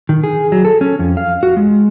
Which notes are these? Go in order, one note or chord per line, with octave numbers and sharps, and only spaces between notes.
D#3
G#4
F#3
A4
C#4
F2
F5
F#4
G#3